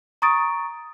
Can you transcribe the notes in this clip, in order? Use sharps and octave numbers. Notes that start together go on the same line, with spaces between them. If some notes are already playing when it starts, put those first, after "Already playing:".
A#5 C#6 D#6 A6 D7